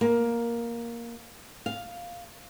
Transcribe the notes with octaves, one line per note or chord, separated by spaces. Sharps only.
A#3
F5